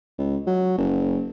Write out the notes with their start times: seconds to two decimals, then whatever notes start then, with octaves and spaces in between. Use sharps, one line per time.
0.18 C#2
0.47 F#3
0.78 F#1